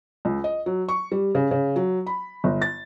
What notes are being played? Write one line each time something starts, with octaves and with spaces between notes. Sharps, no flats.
C#2
D#5
F#3
C#6
G3
C#3
C#3
F#3
B5
G1
A6